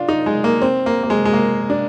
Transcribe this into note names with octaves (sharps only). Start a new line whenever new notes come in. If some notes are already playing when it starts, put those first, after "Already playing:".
Already playing: D4 F4
D#4
G#3
A#3
C4
A#3
A#3
G#3
G#3
A#3
D4